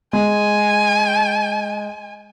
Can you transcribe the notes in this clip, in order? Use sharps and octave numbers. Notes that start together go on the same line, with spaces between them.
G#3 G#5